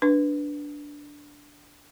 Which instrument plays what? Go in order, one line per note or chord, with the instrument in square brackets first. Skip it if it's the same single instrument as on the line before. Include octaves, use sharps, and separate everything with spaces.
[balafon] D4 B4